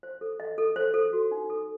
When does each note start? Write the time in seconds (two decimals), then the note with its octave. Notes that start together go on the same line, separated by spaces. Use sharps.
0.03 C5
0.21 A4
0.40 D#5
0.58 A4
0.76 C5
0.94 A4
1.13 F#4
1.31 D#4
1.50 A4